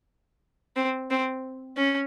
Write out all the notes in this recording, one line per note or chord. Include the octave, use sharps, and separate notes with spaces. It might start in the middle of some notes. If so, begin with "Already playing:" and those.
C4
C4
C#4